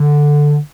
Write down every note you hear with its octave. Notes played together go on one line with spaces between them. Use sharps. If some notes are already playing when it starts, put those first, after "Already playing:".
Already playing: D3